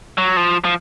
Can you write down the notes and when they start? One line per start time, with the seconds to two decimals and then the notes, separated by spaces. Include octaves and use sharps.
0.18 F#3
0.37 F3
0.65 F3